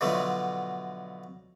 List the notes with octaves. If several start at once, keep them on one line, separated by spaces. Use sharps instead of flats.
B2 D3 F3 F#3 A3